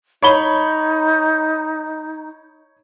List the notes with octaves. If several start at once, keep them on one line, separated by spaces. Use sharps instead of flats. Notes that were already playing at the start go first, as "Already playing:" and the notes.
D#4 C#5 B5 G7